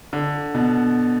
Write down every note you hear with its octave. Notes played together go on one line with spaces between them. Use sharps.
D3
B2